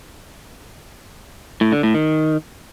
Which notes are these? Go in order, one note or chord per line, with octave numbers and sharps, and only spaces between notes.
A2
D3
A2
D#3